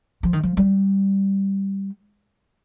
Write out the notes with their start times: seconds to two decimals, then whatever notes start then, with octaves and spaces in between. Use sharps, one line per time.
0.23 F3
0.33 D#3
0.43 F3
0.57 G3